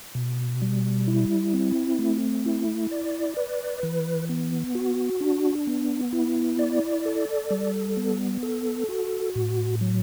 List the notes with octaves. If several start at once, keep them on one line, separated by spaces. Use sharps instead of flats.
B2
G3
E4
C4
A3
E4
D5
B4
E3
B3
F#4
D4
B3
E4
D5
A4
G3
B3
A4
F#4
A2
F#3